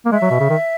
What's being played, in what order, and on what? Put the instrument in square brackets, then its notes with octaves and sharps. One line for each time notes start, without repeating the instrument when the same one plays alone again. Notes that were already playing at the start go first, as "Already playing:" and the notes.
[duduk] A#3
[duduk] G#3 [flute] E5
[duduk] F#3
B2
C#3
D#3